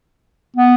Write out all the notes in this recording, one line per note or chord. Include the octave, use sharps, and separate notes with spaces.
B3